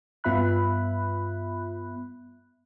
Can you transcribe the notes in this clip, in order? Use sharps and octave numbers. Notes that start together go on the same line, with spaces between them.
G2 B3 F4 E5 B5 F#6